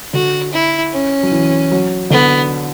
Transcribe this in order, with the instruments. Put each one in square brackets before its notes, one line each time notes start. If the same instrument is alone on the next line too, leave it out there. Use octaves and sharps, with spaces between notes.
[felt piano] D3 [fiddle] F#4
[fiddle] E4
C#4
[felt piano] F#3
E3
F#3
[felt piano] D3 [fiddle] B3